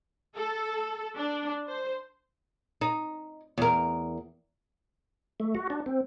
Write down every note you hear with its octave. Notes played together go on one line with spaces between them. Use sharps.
A4
D4
C5
D#4
E2 A#4
A3
F#4
D4
C4